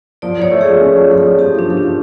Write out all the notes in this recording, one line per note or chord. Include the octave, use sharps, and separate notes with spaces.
F3 D5
F3 C#5
A3
G#4
F3
C#4
F3
F3
F3
F3 G4
F3
D4
F3
D4
F3